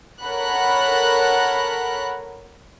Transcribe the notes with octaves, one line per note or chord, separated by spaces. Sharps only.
A4 A#4 C#5 F#5 B5 F#6